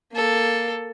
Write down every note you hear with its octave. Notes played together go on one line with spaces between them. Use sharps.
A#3 A4